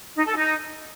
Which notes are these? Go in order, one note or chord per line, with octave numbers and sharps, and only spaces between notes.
D#4
A4
D#4